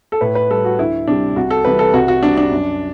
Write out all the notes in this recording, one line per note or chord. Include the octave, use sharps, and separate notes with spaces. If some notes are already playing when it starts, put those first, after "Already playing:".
A4
A2 B4
B4
G3 A4
F#4
D2 E4
C3 G3 D4
C2 F#4
A4
C3 E3 G3 B4
A4
C2 F#4
F#4
C3 G3 D4
D4
F#2